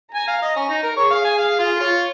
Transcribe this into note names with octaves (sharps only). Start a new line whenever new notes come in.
G#5 A#5
F5
D#5
C#4
D#4
A#4
G#4 C#5
F5
G#5
F5
F4
F4 C#5